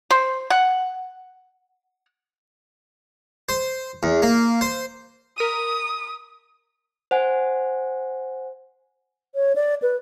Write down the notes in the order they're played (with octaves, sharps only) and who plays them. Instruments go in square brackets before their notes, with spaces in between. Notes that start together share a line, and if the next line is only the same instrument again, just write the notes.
[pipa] C5
F#5
[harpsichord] C5
E2
A#3
C5
[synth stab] A#4 B6 D#7 [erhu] D#6
[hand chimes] C5 F#5 G#5
[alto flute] C#5
D5
B4